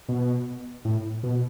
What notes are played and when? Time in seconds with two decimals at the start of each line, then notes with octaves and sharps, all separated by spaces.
0.09 B2
0.85 A2
1.23 B2